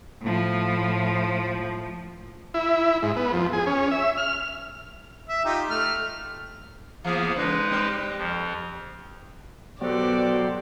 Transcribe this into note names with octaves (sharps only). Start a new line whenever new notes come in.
A2 F3
E4
G#2
B3
F2
G#4
C#4
E5
F6
E5
D#4 F4 G4
A3 F6
E3 A#3 B3 G#4
C#3 G#3 D#4 B4
G3 C4 G4
F2 F3
B2 F#3 B3 F#4 G4 A4 C5 D5